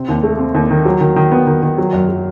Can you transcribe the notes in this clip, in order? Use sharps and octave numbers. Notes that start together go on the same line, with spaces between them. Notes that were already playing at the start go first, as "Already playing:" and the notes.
Already playing: C3 C4
D#2
A3
C4
D#2
D#3
F#3
D#3
D#3
B3
D#3
D#3
F#3
F#2
F#3